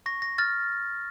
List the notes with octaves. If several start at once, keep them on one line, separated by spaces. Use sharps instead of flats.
C#6 A#6
A#6
F6 A6